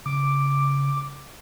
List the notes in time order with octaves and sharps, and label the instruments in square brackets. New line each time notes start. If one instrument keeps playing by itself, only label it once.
[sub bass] C#3 [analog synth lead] D6